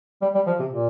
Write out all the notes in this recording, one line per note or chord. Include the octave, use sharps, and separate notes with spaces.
G3
G3
F3
C3
A#2